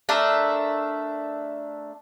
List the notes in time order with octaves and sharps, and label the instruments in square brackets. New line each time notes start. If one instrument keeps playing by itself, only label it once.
[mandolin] A3 D4 A#4 E5